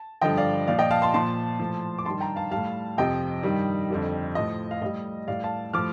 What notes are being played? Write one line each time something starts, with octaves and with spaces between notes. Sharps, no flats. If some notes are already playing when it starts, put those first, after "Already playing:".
Already playing: A5
G2 D3 F3 D#5 G5
D5 F5
A#2 F3 D5 F5
D#5 G5
F5 A5
A5 C6
A#2 F3 A5 C6
A2 F3
D6
G2 D#3 G3 A5 C6
G5 A#5
F5 A5
A2 G3 F5 A5
F2 C3 F3 D#5 G5
G2 D#3 G3
F2 D3 G3
A2 F3 D#5
F5
A2 G3 D#5
A2 G3 D5 F5
F5 A5
A2 F3 D6 F6